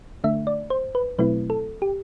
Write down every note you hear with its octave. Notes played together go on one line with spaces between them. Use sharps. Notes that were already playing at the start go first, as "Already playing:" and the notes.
D3 A3 D4 E5
D5
C5
B4
B2 F#3 A3 C4 E4 B4
A4
G4